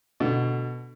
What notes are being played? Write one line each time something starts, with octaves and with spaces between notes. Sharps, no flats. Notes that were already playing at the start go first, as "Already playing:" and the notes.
B2 D3